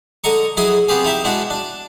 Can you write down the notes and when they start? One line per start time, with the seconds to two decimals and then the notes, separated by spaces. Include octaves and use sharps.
0.24 D3 D#5 A#5 C#6
0.57 F#3 E4 G#4 D#5
0.88 B3 C4 G4 G#4
1.04 D#4 E4 G4 E5
1.24 B2 G#3 D4 E4 F#4
1.50 D4